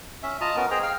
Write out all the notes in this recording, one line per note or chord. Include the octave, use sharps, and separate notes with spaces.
C#4 E5
F4 D#5 A5 A#5 D#6
B3 C#4 A#4
G#4 C5 D#5 G5 A#5
F5 G5 F6